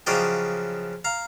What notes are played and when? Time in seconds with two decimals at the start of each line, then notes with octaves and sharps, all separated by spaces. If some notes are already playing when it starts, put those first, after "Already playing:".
0.06 C#3 F3 F#3 D5 D#5 G5
1.05 F5 A#5